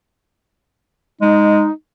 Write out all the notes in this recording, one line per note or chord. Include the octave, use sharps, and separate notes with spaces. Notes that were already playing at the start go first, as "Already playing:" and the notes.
G#3 D#4